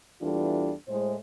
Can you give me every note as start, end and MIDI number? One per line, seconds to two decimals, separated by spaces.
0.22 0.72 40
0.22 0.72 52
0.22 0.72 55
0.22 0.72 62
0.22 0.72 65
0.22 0.72 69
0.88 1.14 45
0.88 1.14 56
0.88 1.14 72